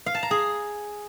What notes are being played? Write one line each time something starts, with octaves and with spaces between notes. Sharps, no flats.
F5
A5
A#5
G#4